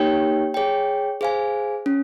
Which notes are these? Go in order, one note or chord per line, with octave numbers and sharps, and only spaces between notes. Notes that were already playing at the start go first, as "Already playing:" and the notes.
Already playing: A#3 D#4 G4 C#5 G5
G#4 C#5 G5
G#4 C5 F5 G#5
C#4